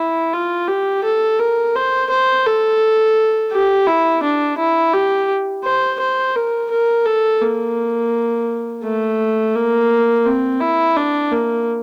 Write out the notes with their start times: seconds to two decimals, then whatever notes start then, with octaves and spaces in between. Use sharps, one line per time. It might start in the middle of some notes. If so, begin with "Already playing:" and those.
Already playing: E4
0.33 F4
0.68 G4
1.04 A4
1.39 A#4
1.75 C5
2.10 C5
2.46 A4
3.52 G4
3.87 E4
4.23 D4
4.58 E4
4.94 G4
5.64 C5
6.00 C5
6.36 A#4
6.71 A#4
7.06 A4
7.41 A#3
8.83 A3
9.55 A#3
10.25 C4
10.60 E4
10.97 D4
11.32 A#3